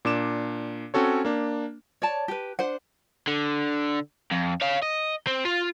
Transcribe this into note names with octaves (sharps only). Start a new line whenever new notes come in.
A#2 D4 D6 E7
C4 C#4 F#4 A4 C#5
A#3 D4
C#5 D5 A5
G4 B4
D4 C5 F#5
D3
F2
C#5 F5
D#5
C4
F4